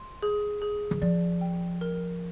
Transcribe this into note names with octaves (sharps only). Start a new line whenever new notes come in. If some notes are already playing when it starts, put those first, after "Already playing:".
Already playing: C6
G#4
G#4
D#3
F3 D5
G5
A#4